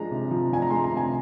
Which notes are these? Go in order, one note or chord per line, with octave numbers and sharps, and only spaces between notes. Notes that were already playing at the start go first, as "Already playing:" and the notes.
Already playing: F3 G#3 D4 A#5
C3
F3
D4 G#5
A#5
G#3 C6
A#5
C3
G#5